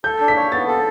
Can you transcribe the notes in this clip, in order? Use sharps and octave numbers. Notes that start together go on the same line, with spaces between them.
A4 G6
D4
B6
C#5
B3 A6
A4